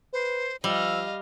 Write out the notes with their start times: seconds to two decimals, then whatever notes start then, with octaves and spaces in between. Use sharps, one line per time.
0.13 B4 C5
0.64 F3 G3 D#5 F5 E6